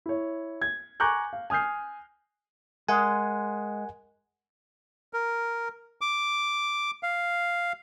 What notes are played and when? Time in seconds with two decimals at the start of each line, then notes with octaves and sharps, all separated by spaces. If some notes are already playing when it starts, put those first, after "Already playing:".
0.06 E4 C#5
0.62 G#6
1.00 G#5 A#5 C#6 D6 F#6 G6
1.33 F5
1.50 G#5 D#6 F6 G6 C7
2.89 G#3 A#4 F#5 G#5
5.13 A#4
6.01 D6
7.03 F5